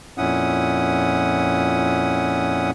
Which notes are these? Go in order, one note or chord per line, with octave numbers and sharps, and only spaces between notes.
F2 A#2 C#4 E4 F#5 D#6